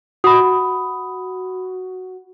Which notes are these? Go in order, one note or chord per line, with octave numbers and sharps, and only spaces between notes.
F#4 B5 D#6